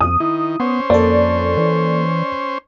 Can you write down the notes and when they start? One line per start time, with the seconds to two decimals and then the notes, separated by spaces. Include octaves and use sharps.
0.01 F2 D#6
0.20 D#3 E4
0.60 B3 C#4 C5
0.90 F2 A#3 A4 D5
1.57 E3